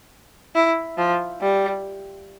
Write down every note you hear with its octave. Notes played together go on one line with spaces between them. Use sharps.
E4
F3
G3